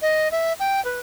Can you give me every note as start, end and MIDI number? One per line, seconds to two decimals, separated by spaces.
0.02 0.28 75
0.32 0.53 76
0.60 0.83 79
0.85 0.99 71